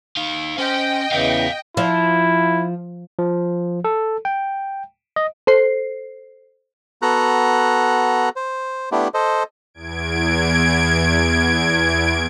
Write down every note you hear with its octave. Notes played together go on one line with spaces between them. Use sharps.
D#4 F5
C#4 C5 D#5 G5
E2 C#3 E3 D5 F5
F3 E4
F3
A4
G5
D#5
A4 C5 C7
B3 F#4 A4 A#5 F#6
C5
A3 B3 D4 E4 G4
A4 C5 D#5
E2 G#6 D7